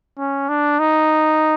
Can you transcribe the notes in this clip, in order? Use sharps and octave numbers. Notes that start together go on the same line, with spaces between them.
C#4
D4
D#4